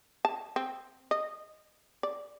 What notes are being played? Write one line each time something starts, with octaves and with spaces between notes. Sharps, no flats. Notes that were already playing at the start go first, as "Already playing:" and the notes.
A5
C4
D#5
D5